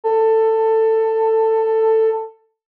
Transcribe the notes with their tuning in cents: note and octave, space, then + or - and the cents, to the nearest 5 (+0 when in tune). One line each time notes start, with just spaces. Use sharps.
A4 +15